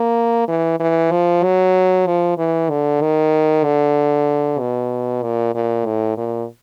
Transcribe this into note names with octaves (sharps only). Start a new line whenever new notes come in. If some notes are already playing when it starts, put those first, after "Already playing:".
Already playing: A#3
E3
E3
F3
F#3
F3
E3
D3
D#3
D3
B2
A#2
A#2
A2
A#2